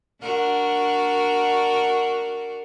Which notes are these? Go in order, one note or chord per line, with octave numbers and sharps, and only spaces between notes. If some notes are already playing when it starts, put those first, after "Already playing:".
D4 F#4 A#4